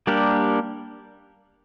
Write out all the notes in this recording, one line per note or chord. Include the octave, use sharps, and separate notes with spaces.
G3 A#3 D4 G4 A#4